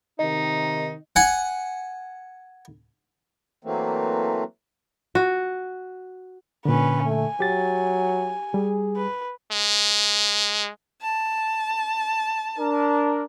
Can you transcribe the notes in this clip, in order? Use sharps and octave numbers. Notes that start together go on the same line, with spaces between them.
C3 D#3 D#4 D#5
F#5 G#5
E3 F#3 A3 A#3 C4
F#4
A#2 D3 C#4 B4
A3 G#5
F#3 G4 A6
G3 G#4
B4
G#3
A5
D4 A#4